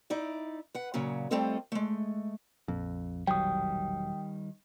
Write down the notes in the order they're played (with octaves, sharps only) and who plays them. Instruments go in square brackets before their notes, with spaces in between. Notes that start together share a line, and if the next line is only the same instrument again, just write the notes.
[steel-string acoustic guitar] D#4 E4 D5
B4 F#5
A#2 C#3 F#3
G3 A3 C4 F4 A4 D#5
G#3 A3
[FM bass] A#1 [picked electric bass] F2
[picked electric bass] E1 F#3 [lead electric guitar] D#3 G3 [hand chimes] G5 D#6